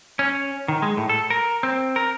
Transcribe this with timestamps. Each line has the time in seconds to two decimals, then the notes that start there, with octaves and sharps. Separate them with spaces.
0.19 C#4
0.68 D#3
0.82 G#3
0.97 A2
1.09 A4
1.30 A#4
1.63 C4
1.96 A#4